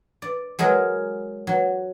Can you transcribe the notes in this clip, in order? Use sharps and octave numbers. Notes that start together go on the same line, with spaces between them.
D5
F#3 G#3 G#4 A#4
F#3